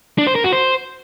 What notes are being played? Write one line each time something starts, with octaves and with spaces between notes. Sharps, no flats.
D4
C5
A#4
F#4
C5